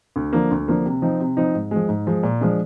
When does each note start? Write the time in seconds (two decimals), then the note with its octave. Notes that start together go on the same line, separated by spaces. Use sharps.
0.16 D2
0.33 D3 F3 A#3
0.51 D2
0.68 D3 F3 A#3
0.86 C3
1.02 F3 C4 D#4
1.20 C3
1.37 F3 C4 D#4
1.55 G#2
1.71 F3 G#3
1.89 G#2
2.07 F3 G#3
2.23 A#2
2.41 F3 G#3 D4